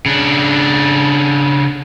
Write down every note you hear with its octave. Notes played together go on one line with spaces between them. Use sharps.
C#3 D4